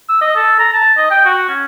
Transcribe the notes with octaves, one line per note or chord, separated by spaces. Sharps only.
E6
D#5
A4
A#5
A5
D#5
G5
F#4
C#4